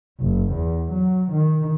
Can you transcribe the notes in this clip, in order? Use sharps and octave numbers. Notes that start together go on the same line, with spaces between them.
F#1
E2
F#3
D#3